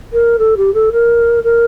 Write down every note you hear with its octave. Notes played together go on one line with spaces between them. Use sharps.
A#4
A4
G4
A4
A#4
A#4